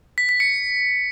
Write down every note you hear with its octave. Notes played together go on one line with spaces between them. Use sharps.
B6
B6
C#7